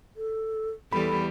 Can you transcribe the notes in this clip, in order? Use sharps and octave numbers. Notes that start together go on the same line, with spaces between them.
A4
E2 G3 A4 B5